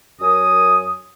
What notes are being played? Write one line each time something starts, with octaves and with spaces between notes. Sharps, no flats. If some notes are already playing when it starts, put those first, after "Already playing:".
F#2 F#3 A#4 G#5 D#6